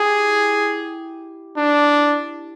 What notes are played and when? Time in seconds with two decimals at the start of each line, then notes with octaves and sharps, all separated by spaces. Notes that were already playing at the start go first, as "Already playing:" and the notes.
Already playing: E4 G4 G#4
1.57 D4